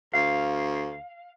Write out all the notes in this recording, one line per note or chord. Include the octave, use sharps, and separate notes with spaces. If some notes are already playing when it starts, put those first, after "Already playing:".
D2 F5